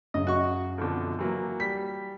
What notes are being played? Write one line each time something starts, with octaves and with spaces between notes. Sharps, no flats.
F#2 C#3 D#5
F#4 C#6
F2 B2 D3
E3 F#3 A#3
G3 B6